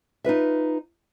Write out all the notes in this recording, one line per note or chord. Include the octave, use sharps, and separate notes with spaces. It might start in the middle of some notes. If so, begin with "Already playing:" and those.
D#4 F4 B4 E5